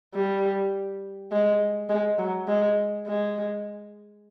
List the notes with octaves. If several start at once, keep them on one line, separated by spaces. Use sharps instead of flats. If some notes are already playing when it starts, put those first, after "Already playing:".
G3
G#3
G#3
F#3
G#3
G#3